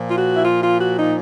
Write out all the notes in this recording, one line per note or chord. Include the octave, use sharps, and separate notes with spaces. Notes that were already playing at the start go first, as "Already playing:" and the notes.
Already playing: A#2 F3
F4
F#4
E4
F4
F4
F#4
D#4